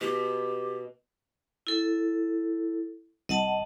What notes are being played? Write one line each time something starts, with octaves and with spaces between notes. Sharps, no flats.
B2 G4
E4 A4
C2 D#5 F#5 A5